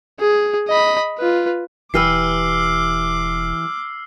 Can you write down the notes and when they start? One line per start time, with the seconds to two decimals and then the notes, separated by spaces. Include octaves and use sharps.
0.20 G#4
0.68 D#5 B5
1.19 F4 B4
1.94 E1 E3 G4 B4 D6 E6 F6 C7